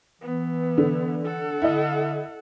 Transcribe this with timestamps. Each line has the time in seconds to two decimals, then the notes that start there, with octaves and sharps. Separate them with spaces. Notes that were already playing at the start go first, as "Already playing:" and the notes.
0.21 E3 B3
0.78 D3
1.25 A4 F#5
1.62 D3 E4 D#5